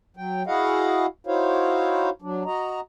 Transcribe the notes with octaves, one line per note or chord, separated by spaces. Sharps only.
F#3 G5
E4 F#4 G#4 D#5 F5 F#5
D#4 E4 F#4 C5 C#5 F5
F#3 D4
F#4 D#5 A#5